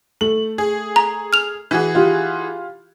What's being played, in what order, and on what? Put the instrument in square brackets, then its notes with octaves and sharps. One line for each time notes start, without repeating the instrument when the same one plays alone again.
[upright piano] A3 [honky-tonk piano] F#7
[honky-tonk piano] G#4
[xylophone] A#5
F6 F7
[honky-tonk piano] E3 F#4 G#4
[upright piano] F4 G4